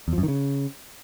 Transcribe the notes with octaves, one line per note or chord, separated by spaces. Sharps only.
E2
F3
F#2
D#3
C#3